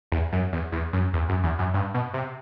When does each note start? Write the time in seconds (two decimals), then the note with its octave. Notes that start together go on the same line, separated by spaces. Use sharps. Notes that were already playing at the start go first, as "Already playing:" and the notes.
0.12 E2
0.32 F#2
0.53 E2
0.72 E2
0.93 F#2
1.13 E2
1.29 F#2
1.43 E2
1.59 F#2
1.74 G2
1.94 B2
2.13 C3